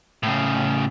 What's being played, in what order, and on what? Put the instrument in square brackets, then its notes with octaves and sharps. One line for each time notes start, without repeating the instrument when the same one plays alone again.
[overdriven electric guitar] A2 C#3